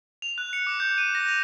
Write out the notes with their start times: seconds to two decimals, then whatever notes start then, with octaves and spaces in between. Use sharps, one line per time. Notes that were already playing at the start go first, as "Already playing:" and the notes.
0.22 F7
0.38 F#6
0.53 C#7
0.67 D6
0.80 G6
0.98 D#7
1.15 A#6
1.28 F7